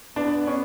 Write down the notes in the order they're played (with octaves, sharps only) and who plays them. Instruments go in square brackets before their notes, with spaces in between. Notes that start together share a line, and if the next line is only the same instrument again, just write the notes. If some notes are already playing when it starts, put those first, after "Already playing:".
[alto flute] B3 [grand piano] D4
[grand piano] C#4